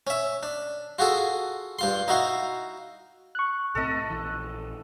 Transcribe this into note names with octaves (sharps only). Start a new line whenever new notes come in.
C#4 E5
D4
F4 F#4 G#4 A4
G2 F4 C6
D#4 E4 F#4 F5
C#6 F#6
B1 A2 C4 A4 D#5
A#1 E3